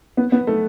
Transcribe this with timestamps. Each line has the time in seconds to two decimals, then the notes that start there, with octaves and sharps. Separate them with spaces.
0.17 B3
0.32 B3
0.47 A3